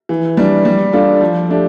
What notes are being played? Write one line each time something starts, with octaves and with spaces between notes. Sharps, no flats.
E3
G3 D4
G3
D4 F4 A4
F3
A3 D4 G4